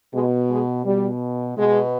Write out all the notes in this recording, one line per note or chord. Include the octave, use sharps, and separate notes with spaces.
B2 G#3
G#3
B2 G3
B2 G#3